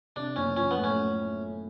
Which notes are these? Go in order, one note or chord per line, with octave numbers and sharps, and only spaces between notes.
C3 D4
F#1 C#4
F3 C#4
B3
A2
C#4